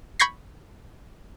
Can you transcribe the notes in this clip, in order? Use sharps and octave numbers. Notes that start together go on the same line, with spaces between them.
B5 C#6 G6 G#6 A#6 C7